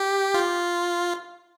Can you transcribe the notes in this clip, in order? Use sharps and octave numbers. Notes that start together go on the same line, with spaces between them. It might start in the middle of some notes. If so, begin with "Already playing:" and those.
Already playing: G4
F4